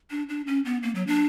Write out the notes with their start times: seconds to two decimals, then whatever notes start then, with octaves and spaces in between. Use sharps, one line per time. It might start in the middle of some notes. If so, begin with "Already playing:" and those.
0.11 D4
0.29 D4
0.47 C#4
0.65 B3
0.83 A#3
0.95 F#3
1.07 D4